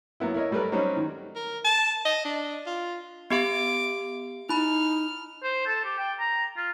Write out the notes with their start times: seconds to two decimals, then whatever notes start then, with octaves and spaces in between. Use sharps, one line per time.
0.20 F#3 A#3 B3 E4
0.34 E4 A#4 C#5 D#5
0.51 F#3 G3 A3 A#4 B4
0.72 F#3 G3 C4 C#4 D#4
0.97 D#3
1.36 A#4
1.64 A5
2.05 D#5
2.25 D4
2.66 F4
3.30 B3 G4 F5 D6
4.49 D#4 E4 B5 F6
5.43 C5
5.66 A4
5.85 G4
5.98 G5
6.19 A#5
6.57 F4